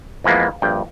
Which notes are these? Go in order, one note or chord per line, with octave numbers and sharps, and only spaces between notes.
F2 E3 F3 G#3 A#3 B3
A#1 G2 G5